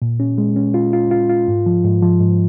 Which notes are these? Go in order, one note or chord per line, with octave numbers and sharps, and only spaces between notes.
A#2
C#4
G#3
C#4
F4
F4
F4
F4
G#2
F3
G#2
F3
G#2